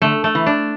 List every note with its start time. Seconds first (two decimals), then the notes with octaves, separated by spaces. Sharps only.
0.02 D3 A3
0.24 A3
0.35 E3
0.46 D4